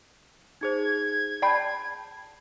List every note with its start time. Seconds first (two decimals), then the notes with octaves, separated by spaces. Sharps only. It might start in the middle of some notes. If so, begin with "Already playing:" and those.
0.61 D#4 G#4 C5 G#6
1.42 D5 G5 A5 B5 G6 C7